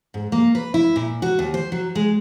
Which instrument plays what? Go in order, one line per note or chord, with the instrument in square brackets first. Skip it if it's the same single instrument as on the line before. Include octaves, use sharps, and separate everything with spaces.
[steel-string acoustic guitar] G#2
A#3
B4
E4
A#2
F#4
D#2
C5
F#3
G#3